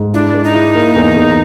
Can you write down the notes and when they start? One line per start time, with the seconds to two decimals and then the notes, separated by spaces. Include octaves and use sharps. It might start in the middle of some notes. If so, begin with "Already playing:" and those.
Already playing: G#2
0.14 D4 E4
0.34 G#3
0.44 D#4
0.55 E4
0.75 A#3
0.96 E2
1.16 E2